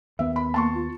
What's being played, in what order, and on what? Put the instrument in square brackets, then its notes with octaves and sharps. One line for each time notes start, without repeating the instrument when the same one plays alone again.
[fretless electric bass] D#2 B3 [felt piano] E5
[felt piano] B5
[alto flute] A#3 [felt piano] A5 C6 C#6
[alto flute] F4